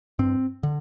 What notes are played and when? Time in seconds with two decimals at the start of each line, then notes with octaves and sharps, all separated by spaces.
0.19 G2 C4
0.63 D3